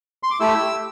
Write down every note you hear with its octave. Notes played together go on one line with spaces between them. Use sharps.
C6
D6
A3 E4 G4 E6